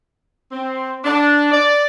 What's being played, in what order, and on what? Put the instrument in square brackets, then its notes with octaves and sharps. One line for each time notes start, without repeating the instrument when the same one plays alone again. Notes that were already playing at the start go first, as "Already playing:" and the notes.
[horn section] C4
D4
D5